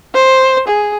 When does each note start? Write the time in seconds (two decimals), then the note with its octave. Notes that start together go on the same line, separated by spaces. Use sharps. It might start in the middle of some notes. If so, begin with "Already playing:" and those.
0.15 C5
0.68 G#4